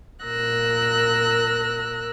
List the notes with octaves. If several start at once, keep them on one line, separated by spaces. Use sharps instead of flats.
A#2 A#4 E6 F#6 A#6